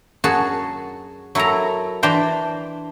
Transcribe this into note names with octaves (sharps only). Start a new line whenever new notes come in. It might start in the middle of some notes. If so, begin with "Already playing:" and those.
F#2 F#4 G#4 A5
F#3 E4 A4 A#4 A#5
E3 D4 C5 G5 A#5